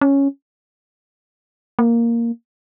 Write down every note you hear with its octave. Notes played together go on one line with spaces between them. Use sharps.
C#4
A#3